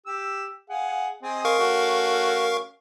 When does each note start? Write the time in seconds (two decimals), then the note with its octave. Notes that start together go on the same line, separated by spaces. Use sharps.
0.06 G4 E6
0.70 G#4 F5 F#5
1.22 C4 G#4 D#5
1.45 A#4 F5 C#6
1.59 A3 C#4 F#4